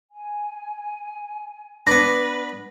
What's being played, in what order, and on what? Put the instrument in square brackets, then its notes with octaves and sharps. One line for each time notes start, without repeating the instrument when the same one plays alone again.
[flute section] G#5
[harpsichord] B3 D4 [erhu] B4 [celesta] A#6